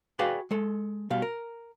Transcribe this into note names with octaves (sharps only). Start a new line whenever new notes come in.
F#4 G#4 B4 D5 F5 G5
G#3 A4
B2 G3 F5
A#4